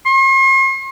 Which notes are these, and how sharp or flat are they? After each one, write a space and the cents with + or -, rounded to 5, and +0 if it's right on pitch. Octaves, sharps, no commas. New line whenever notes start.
C6 +45